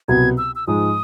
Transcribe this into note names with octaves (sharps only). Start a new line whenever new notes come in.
C2 B2 F#3 B3 G#6
E6
E6
G#2 F3 G#3 D#6